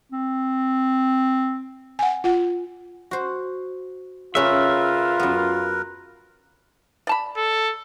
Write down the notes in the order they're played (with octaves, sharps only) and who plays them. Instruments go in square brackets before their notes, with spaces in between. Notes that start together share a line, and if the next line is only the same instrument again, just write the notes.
[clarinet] C4
[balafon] F#5 G#5
F4 F#5
[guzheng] F#4 C5
[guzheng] C#3 C#4 [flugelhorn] F4 [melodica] A#4 B4 [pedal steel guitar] E5
[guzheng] F#2 B3
[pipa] D5 A5 B5
[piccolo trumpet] A4